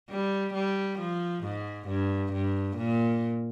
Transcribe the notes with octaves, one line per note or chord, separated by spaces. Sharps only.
G3
G3
F3
G#2
G2
G2
A#2